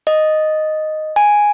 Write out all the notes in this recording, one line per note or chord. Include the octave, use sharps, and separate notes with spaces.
D#5
G#5